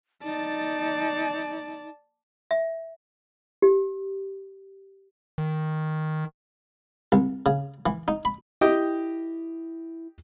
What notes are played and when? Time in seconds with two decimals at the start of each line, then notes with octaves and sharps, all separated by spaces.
0.24 D#4 D5 A5
2.51 E5
3.62 G4
5.38 D#3
7.12 C2
7.46 C#3
7.86 E3
8.08 D#4
8.25 B5
8.61 E4 G4 D#5 G5